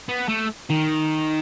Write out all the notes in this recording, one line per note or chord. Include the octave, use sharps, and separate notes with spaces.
B3
A3
D#3